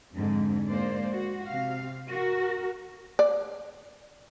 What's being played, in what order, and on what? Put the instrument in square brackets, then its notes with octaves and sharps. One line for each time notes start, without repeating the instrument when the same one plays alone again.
[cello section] F2 G#2 D3
G#3 A#3 C5 D5
F#4
C3 F5
F#4 A#4
[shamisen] D5